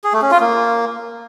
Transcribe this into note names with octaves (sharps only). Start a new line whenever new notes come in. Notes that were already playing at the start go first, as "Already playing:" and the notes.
G#4
A3
C#4
F4
A#3